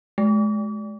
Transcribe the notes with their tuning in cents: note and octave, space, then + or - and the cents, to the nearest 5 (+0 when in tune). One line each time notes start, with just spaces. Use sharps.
G#3 +30